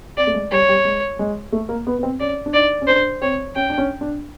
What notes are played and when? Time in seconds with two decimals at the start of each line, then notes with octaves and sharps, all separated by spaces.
0.17 C4 D5
0.27 A3
0.34 G#3
0.51 G3 C#5
0.69 G3
0.85 G#3
1.19 G#3
1.52 A3
1.69 A#3
1.87 B3
1.98 B3
2.03 C4
2.20 C#4 D5
2.46 D4
2.53 D#4 D5
2.82 C#4
2.87 D4 C5
3.22 C4 C#5
3.55 C#4 G5
3.70 D4
3.78 C#4
4.01 D4